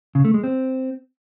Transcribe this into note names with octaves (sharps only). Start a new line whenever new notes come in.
C#3
A3
G#3
C4